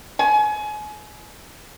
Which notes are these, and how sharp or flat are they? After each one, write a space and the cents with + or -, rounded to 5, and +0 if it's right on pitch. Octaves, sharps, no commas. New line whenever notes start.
G#5 +30